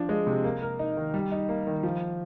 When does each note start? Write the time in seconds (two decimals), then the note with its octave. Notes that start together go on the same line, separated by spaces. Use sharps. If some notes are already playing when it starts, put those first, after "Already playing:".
Already playing: F3 D4
0.09 G#3
0.27 C3
0.44 A#3
0.62 A#4
0.79 D#4
0.97 D#3
1.14 G3
1.32 D#4
1.49 A#3
1.67 D#3
1.83 F3